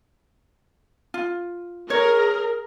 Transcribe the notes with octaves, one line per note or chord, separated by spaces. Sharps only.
F4
G#4 A#4 C#5